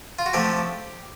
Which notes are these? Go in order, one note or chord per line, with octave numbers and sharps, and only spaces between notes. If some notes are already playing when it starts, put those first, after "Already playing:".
F4
F#4
C3 F3 A3 G4